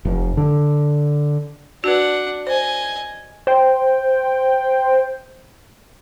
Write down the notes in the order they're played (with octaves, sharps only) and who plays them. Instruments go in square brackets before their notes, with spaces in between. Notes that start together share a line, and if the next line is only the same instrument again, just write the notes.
[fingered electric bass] F1
D3
[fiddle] D4 F#5 [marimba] F#4 B4
[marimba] C5 [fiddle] D#5 G#5
[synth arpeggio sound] C5 G5